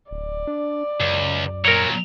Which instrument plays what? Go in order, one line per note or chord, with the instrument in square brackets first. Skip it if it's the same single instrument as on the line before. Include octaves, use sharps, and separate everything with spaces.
[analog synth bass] D1 [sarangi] D5
[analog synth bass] D4
[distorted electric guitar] C#2 [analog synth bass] F#2
[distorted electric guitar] A#2 F#3 [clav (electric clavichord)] A#4 C#5